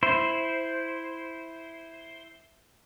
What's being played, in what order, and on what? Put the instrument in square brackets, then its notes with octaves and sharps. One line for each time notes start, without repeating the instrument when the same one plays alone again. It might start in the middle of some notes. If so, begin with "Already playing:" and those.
[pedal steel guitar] E4 C5